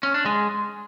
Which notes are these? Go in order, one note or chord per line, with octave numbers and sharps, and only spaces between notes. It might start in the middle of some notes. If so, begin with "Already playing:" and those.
C#4
D4
G#3